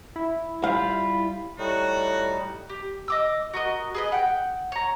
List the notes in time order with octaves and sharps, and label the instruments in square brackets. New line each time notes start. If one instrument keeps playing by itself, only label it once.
[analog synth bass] E4
[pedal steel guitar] G3 F4 [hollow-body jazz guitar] F5 [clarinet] B5
[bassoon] A2 [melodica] G3 [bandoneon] D#4 [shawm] F#4
[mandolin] G4
D#5 D6 E6
F#4 A#4 D#5
G#4 B4 D#5
F#5 G5
C#5 A#5